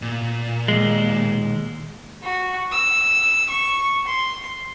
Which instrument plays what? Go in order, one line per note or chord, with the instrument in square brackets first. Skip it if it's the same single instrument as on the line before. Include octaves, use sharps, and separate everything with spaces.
[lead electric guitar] A#2
[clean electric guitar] D#2 G#3
[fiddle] F#4
E6
C#6
C6